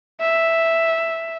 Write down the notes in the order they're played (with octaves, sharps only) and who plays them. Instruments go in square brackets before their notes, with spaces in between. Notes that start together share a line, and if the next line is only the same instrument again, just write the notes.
[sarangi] E5